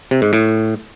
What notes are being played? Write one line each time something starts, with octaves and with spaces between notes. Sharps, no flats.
C3
G#2
A2